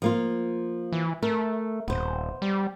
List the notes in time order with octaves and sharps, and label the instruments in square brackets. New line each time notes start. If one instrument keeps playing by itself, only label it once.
[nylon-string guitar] F3 A#3 F4
[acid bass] E3
[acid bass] A3 [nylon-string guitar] A#4
[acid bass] D#1 [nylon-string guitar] B3 C5
[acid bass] G3